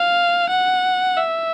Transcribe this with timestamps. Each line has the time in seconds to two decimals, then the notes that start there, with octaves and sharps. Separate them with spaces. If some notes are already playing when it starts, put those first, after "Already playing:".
Already playing: F5
0.50 F#5
1.17 E5